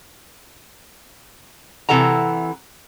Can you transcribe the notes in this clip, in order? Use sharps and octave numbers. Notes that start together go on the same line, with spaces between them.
C3 E3 A4 F#5 A#5